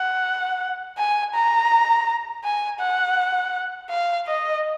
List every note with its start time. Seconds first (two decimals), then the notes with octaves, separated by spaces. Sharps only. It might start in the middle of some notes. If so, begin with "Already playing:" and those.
Already playing: F#5
0.98 G#5
1.34 A#5
2.44 G#5
2.80 F#5
3.90 F5
4.27 D#5